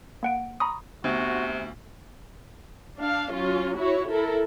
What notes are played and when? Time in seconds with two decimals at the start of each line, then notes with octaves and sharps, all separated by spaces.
0.23 A#3 F#5 D7
0.60 A#5 B5 C#6 D#6
1.04 D2 C3 B3 F#4
2.98 D4 F5
3.31 F#3 C#4 F4
3.76 E4 F#4 C#5
4.08 E4 A4 A#4